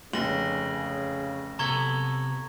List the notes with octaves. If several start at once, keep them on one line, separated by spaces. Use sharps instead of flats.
F1 C#3 A#6 F#7
C3 B3 A4 A#5 C#6 G#6